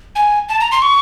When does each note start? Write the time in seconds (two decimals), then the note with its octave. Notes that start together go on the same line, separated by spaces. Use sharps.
0.16 G#5
0.49 A5
0.60 A#5
0.72 C6
0.82 C#6